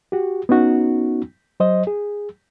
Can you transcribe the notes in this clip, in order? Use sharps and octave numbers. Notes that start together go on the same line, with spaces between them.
F#4 G4
B3 C#4 D#4 F#4
F#3 C5 D#5
G#4